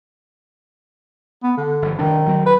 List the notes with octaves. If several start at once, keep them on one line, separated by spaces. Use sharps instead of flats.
B3
D3
G1 E3 F3
F1 C2 D#3 D4
D2 F#3 C4
B4